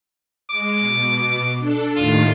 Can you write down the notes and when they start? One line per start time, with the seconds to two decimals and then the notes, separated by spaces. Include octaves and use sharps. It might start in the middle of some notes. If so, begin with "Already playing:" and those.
0.51 G#3 D6
0.80 B2
1.58 D4 A4
1.96 D#2 A2 D#3 F4